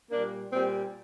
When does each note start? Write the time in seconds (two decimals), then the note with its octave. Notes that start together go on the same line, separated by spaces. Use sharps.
0.12 A#2 G3 A#3 D4
0.51 A#2 G3 C4